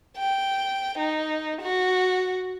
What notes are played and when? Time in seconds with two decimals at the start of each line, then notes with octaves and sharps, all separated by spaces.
0.17 G5
0.98 D#4
1.61 F#4